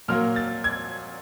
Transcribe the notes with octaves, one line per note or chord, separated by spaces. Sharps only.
A#2 F#3 A#3 F6
A6
G#6